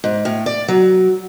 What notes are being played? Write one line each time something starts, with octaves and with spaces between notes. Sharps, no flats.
G#2
A2
D5
F#3